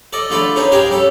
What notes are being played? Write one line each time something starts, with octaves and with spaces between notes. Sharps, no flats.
A4 D5 D#5
D3 A3 F4 A4 D5 B5
C#4 D#4 G#4 B4 C5
G4 G#4 A#4 F5 G5 G#5
G3 C#4 A4